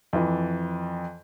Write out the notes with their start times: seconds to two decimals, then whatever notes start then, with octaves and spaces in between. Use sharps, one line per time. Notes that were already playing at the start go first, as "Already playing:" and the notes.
0.13 F2 E3